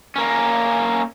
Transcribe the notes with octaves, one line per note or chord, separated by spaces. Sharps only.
A#3 C#4